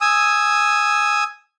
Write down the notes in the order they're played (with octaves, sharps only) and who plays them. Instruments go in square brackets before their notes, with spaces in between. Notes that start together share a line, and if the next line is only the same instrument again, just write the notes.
[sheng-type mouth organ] G#5 D#6 E6